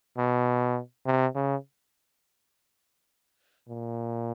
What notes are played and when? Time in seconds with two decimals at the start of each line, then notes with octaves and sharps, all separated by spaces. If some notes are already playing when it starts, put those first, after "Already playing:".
0.18 B2
1.06 C3
1.35 C#3
3.69 A#2